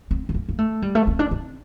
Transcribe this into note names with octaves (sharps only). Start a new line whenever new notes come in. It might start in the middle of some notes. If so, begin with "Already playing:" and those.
C4
C4
A#3
A#3
A3
G3
A3
C4
D4
C4